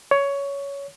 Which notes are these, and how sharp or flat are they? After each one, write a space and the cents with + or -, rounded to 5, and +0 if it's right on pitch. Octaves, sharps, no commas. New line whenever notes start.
C#5 +15